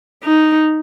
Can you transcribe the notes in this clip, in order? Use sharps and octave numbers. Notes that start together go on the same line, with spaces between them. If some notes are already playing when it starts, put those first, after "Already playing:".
D#4